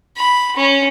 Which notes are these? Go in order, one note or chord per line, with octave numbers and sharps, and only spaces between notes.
B5
C#4